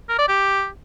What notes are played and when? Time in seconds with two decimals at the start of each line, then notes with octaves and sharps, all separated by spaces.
0.09 A#4
0.19 D5
0.28 G4